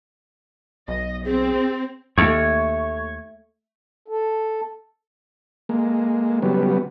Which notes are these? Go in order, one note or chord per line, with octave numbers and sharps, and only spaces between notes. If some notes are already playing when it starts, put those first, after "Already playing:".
B1 D#5
C4 G#4
D#2 A3 C#5
A4
G#3 A#3
C#3 F#3 G3 B3